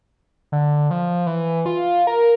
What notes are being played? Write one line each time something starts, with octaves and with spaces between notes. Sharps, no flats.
D3
F3
E3
F4
A#4